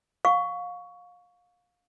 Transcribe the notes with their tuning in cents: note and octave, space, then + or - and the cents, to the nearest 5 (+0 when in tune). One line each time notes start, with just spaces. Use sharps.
F5 +30 C#6 +15